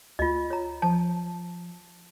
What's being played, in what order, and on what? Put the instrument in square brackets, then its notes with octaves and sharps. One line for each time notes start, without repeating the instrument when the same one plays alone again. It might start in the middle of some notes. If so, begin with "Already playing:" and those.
[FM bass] D2 [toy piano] F4 D#5
[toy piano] C#5 A#5
[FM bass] F3 [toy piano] A5